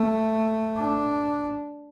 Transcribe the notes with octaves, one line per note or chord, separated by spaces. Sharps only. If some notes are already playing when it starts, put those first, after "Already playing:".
Already playing: A3
D4